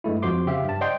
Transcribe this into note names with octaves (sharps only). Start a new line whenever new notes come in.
G2 G#3 A3 E4
F2 F3 F#4 C5 C6 D6
C#3 G4 E5 F5
G2 A5
C5 D5 D#5 F#5 G5 C6